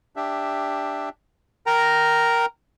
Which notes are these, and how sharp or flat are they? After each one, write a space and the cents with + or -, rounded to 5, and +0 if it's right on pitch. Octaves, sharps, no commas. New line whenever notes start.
D4 +0 G4 +5 E5 +0
A#4 +0 G5 -15 A#5 +0